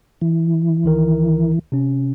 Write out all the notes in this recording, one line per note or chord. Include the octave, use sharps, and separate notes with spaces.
E3
C#2 D#3 A#4
C3 C#4